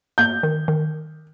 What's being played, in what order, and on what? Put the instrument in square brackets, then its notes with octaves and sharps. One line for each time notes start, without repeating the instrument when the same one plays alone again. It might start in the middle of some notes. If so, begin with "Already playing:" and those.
[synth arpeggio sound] A#3 [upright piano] G6
[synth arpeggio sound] D#3
D#3